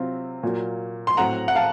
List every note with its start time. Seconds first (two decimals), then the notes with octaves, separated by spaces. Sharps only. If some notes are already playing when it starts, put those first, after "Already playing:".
Already playing: C3 F#3 C4 F4
0.43 A#2 F#3 A#3
1.07 C6
1.17 A2 F#3 C4 F#5 A#5
1.48 F#5
1.55 F5 A5